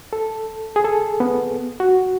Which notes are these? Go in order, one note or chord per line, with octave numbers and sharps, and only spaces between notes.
A4
G#4
A4
B3
F#4